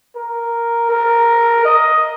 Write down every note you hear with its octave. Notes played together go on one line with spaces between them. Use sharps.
A#4
A#4
D#5